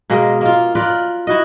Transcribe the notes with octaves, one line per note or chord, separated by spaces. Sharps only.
B2 G#3 A#3 D#5
A#3 F4
F4 A#4 B4 D5
E4 F#4 D#5